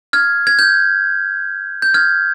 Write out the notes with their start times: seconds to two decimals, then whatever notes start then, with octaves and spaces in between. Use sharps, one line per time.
0.13 F6 G#6
0.47 G#6
0.59 G6
1.82 G6
1.94 F6 G#6